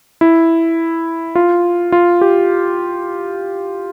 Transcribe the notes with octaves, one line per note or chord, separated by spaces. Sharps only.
E4
F4
F4
G4